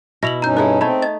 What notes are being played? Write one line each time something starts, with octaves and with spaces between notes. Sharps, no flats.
B2 E4 A#6 F7 F#7
G2 C#4 D#4 A#5 G6
E4 G#4 A4 C#5
A3 C4 D#4 B5 G#6
D#5 A6